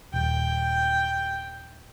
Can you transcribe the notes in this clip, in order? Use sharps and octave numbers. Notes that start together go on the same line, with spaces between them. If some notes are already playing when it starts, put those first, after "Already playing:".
D#1 G5